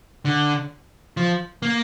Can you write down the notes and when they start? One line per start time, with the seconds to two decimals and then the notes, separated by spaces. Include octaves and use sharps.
0.25 D3
1.17 F3
1.62 A#3